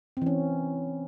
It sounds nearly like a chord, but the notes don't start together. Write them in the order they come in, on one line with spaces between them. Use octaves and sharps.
C4 E3 C#4